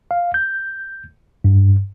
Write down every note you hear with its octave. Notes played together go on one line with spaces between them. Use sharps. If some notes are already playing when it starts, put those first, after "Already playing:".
F5
G6
G2